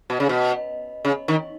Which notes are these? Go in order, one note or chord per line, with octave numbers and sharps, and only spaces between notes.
B2
C#3
B2
C#3
D#3